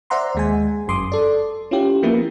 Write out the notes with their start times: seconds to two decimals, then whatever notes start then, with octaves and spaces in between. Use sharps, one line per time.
0.10 C5 D5 E5 F#5 A#5 C6
0.35 D#2 G#3 G#5
0.87 G1 F#2 C6 D6 D#6
1.12 A4 D5
1.71 C#4 E4 F4 G4
2.02 E3 F3 A#3 B3 E4